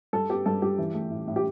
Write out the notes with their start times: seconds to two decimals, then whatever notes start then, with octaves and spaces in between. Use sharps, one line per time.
0.13 G2 A4
0.29 B3 G4
0.46 G2 A4
0.62 G2 G4
0.78 E3
0.94 A3
1.10 A2
1.27 A2
1.36 G4